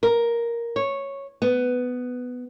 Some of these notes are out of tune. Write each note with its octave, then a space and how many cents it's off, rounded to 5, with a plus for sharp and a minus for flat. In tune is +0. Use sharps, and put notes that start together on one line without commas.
A#4 +5
C#5 -5
B3 +10